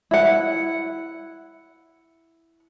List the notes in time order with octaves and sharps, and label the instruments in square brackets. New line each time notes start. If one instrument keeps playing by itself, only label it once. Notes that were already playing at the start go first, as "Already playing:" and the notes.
[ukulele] E4 F#5